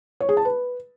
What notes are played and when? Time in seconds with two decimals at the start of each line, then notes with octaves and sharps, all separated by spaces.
0.20 C#5
0.29 G#4
0.37 A5
0.45 B4